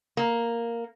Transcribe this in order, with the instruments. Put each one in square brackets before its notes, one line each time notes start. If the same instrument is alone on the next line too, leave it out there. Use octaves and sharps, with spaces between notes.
[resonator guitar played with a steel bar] A#3